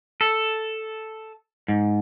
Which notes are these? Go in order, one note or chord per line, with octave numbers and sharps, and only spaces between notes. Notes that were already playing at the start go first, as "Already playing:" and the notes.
A4
G#2